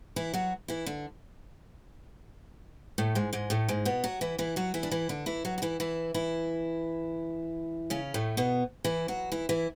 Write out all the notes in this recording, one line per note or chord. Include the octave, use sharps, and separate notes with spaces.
E3 E4
F#3 F#4
E3 E4
D3 D4
A2 A3
G#2 G#3
G#2 G#3
A2 A3
G#2 G#3
B2 B3
F#3 F#4
E3 E4
E3 E4
F#3 F#4
E3 E4
D4
E3 E4
D3 D4
E3 E4
F#3 F#4
F#4
E3 E4
E3 E4
E3 E4
C#3 C#4
A2 A3
B2 B3
E3 E4
F#3 F#4
E3 E4
E3 E4